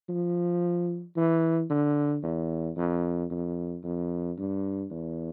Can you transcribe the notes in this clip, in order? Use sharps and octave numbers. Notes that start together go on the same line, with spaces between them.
F3
E3
D3
E2
F2
F2
F2
G2
E2